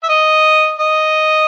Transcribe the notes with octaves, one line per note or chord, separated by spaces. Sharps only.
E5
D#5
D#5